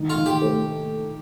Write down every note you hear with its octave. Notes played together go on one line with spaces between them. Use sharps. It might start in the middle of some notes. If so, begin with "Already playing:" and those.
Already playing: D#3
F4
D#3
G4
A3